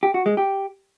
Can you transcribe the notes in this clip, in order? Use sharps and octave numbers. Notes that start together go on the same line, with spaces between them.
G4
F#4
G#3
G4